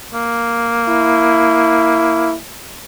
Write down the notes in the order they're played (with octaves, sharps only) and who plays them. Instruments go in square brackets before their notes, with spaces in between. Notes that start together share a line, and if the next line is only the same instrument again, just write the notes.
[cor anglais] A#3
[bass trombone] E4